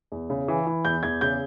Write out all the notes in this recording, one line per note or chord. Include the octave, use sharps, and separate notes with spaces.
E2
C#3
E3
E3
E2 G6
E2 G#6
C#3 G6